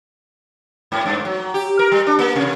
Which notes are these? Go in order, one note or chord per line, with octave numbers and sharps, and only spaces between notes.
G#2
G2
F#3
G4
A#4
G3
D4
A#3
C3